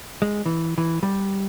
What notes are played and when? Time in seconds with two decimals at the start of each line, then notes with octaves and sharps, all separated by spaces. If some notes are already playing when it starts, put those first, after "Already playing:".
0.22 G#3
0.46 E3
0.78 E3
1.03 G3